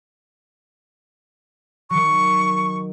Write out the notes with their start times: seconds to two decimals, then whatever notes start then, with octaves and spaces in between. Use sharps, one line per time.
1.90 D#3 F#3 C#6